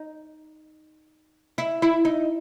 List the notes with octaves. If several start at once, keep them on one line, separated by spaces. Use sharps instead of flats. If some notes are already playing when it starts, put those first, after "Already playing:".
Already playing: D#4
E4
E4
D#4